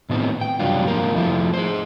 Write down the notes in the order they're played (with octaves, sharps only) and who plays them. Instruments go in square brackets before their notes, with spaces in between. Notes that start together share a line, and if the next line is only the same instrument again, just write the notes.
[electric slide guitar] A2 D#3 B3 C4
G5
F#2 C3 F#3 G3 D4 F4
G#2 F3 A#3 A#4
F2 F3 A3 E4
G#4 C5